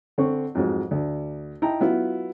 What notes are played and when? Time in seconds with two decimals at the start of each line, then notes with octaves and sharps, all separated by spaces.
0.18 D3 C4 C#6
0.55 F2 G#2 F#3
0.91 D2
1.62 D#4 E4 G5 A5 A#5
1.80 F#3 B3 E4 F4